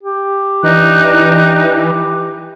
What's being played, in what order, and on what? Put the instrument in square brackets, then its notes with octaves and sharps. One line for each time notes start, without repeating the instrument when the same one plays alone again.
[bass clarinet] G4
[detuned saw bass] E3 [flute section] D4 D#4 F#6